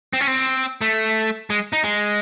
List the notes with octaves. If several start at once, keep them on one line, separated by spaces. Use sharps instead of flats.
C4
C#4
C4
A3
G#3
D#4
G#3